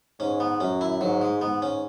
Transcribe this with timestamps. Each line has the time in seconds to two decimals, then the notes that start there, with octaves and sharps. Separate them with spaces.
0.20 G#2 C#4
0.40 B3
0.60 F#2 C#4
0.81 E4
1.01 G#2 F#3
1.22 G#3
1.41 G#2 B3
1.62 C#4